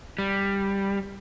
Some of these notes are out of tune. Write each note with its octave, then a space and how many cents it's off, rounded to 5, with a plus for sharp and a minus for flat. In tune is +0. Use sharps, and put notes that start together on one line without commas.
G3 +10